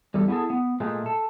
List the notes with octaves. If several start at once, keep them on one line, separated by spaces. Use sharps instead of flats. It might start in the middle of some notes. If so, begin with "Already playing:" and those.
E2 G3 G4 A4
B3 E4 F#4 G#4 A4
B3
A#2 G#3 A3
A4